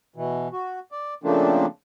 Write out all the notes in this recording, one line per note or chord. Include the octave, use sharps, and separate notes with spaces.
B2 E3
F#4
D5
C#3 F3 A3 A#3 C4 D4